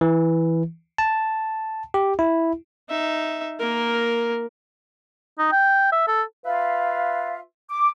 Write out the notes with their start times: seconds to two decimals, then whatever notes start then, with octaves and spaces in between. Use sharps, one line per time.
0.01 E3
0.98 A5
1.94 G4
2.19 E4
2.89 D#4 E5
3.59 A#3 A#4
5.39 D#4
5.52 G5
5.92 E5
6.08 A4
6.45 F4 B4 E5 F5
7.70 D6